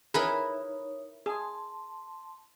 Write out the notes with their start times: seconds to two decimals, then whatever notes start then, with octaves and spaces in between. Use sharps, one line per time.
0.14 D#4 E4 G#4 A#4 B4 C#5
1.26 G#4 A5 C6